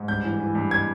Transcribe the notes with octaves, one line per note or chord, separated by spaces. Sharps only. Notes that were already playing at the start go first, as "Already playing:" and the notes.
Already playing: G#2
G2 G6
E3
E3
G2
G#6